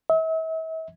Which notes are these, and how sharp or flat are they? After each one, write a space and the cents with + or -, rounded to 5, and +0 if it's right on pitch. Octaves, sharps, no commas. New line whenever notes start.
E5 -40